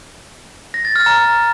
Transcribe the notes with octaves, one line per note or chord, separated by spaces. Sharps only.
A#6
A6
F6
A#5